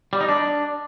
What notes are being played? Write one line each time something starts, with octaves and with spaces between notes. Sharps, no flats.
G3
D#4
D4